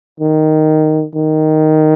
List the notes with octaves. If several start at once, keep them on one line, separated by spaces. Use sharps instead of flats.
D#3
D#3